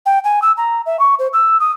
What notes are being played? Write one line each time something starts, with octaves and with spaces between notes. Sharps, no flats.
G5
G#5
E6
A#5
E5
C#6
C5
E6
D#6